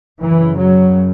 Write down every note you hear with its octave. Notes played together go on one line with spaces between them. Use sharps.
F#2 C#3 E3
F#3